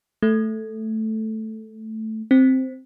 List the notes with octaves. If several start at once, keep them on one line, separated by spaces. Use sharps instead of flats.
A3
C4